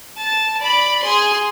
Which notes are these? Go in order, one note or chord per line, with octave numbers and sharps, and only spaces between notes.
A5
D5 B5
G#4 C6